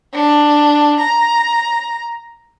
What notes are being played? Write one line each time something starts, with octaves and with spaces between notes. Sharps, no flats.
D4
A#5